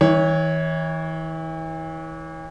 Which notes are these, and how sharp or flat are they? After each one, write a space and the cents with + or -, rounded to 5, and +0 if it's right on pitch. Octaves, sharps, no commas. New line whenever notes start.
E3 -35 C#5 +0